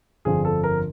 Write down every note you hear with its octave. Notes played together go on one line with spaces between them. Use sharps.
G1 F2 D3 F3 G#4
A4
A#4